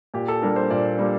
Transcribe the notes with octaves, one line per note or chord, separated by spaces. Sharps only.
A#2 G4
A4
G3 A#3 D4 A#4
C5
A#2 D5
G3 A#3 D4